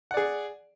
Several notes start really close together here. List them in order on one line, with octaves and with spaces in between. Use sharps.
F#5 D5 G#4